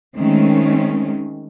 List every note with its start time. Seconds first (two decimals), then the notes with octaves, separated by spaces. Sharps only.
0.16 D#3 G#3 A3 C4 C#4